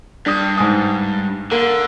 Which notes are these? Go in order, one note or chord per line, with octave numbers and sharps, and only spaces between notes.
G2 D4 D#6
G#2 G#5 D#6
D3 A#3